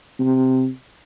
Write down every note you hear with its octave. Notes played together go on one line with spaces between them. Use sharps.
C3